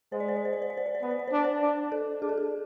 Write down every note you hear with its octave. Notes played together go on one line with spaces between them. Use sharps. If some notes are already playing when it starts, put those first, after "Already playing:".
G#3 C5
D5
C5
D5
C5
D5
C5
D5
C5
D5
C5
B3 D5
C5
D5
C5
D4 D5
C5
D4
A4
D4 G#4
A4
G#4